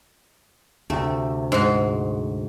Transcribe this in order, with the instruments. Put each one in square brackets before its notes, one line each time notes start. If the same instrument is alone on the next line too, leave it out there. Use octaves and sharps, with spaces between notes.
[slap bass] D2 C3 [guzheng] A3
[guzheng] G#2 F#4